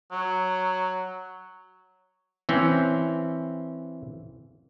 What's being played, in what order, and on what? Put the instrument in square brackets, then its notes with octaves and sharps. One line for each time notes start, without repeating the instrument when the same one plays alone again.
[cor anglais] F#3
[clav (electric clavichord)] E3 C4 C#4